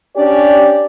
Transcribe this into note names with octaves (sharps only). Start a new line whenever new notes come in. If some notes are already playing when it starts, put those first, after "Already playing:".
C#4 D4 G4 D5